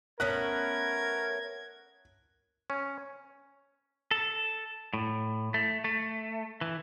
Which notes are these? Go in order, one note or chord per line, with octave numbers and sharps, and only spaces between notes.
A3 B3 C#4 A#4 F#6 G#6
C#4
A4
A2
A3
A3
E3